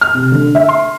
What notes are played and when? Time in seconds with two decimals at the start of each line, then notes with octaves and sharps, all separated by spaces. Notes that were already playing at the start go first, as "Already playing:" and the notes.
0.01 F6
0.14 C3
0.32 D3
0.55 E5
0.69 C6